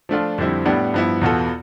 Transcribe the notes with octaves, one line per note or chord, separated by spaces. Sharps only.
F3 A3 D4 F4
F2 D3 G3 C4 E4
A2 G3 B3 D4
G2 F3 B3 E4
E2 B2 B3 F4 A4